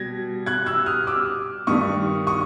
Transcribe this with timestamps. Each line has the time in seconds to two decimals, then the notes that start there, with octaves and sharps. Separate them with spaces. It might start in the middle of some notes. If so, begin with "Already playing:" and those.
Already playing: B2 G3 G#6 A#6
0.46 F#6 G#6
0.66 E6 F#6
0.86 D#6 F6
1.07 D6 E6
1.67 G2 D#3 G3 C#6 D#6
2.27 C#6 D#6